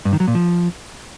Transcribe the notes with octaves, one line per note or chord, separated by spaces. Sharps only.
G2
D#3
F#3
A#2
F3